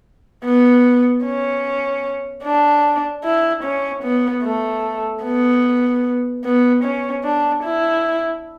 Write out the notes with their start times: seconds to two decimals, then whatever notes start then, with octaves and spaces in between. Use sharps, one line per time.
0.44 B3
1.24 C#4
2.44 D4
3.24 E4
3.64 C#4
4.03 B3
4.43 A3
5.24 B3
6.44 B3
6.84 C#4
7.24 D4
7.64 E4